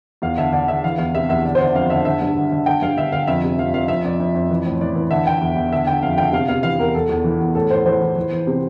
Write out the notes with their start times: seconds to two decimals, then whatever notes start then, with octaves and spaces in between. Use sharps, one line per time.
0.22 E2 F5
0.38 D3 E5
0.52 D3 D5
0.68 D3 E5
0.84 E3 F5
0.98 E2 F5
1.15 C3 E5
1.29 E2 E5
1.45 D3 D5
1.55 C5
1.60 D3 D5
1.75 F2 F5
1.90 D3 E5
2.05 D3 E5
2.21 G2
2.37 D3
2.52 D3
2.66 D3 G5
2.82 G2 F5
2.97 D3 E5
3.12 D3 F5
3.27 F2 E5
3.44 C3
3.59 F2 F5
3.73 F2 F5
3.88 F2 E5
4.04 F2 D5
4.20 F2
4.35 F2
4.50 E3
4.66 A2
4.81 E3 D5
4.95 E3
5.10 D3 E5
5.26 D3 G5
5.41 E2
5.56 E2
5.72 D3 E5
5.87 D3 G5
6.03 F2 F5
6.18 D3 G5
6.33 C3 F5
6.48 C3 F5
6.63 E3 F5
6.79 E2 A#4
6.95 E2 A4
7.09 E2
7.24 E3
7.40 E2
7.55 A2 A4
7.70 A2 C5
7.85 E3 C5
8.01 E3
8.16 E3
8.32 E3
8.47 C3